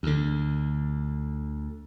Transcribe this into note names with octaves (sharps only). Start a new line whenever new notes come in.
D2 D3